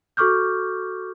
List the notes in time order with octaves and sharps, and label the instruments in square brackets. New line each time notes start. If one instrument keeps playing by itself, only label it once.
[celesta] F#4 A4 C#6 D6 F6 G6